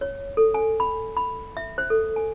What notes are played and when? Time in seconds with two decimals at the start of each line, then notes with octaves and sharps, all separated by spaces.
0.01 C#5
0.37 A4
0.54 G#5
0.80 B5
1.17 B5
1.57 E5
1.78 C5
1.90 A4
2.16 G#5